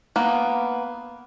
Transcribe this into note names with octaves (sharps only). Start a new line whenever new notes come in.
A#3 B3